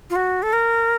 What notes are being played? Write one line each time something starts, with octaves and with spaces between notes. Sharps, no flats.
F4
F#4
A4
A#4